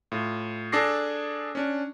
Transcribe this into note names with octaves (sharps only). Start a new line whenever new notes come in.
A2 F4
D4 G#4 A4 D6 A#6 C7
C#4 D4